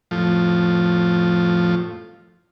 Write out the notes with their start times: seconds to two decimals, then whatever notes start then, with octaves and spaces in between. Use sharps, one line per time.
0.11 F2 A2 F3